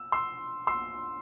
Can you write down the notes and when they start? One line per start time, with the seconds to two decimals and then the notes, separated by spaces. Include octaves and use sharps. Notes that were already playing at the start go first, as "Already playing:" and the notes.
Already playing: E6
0.12 C6 E6
0.67 C6 E6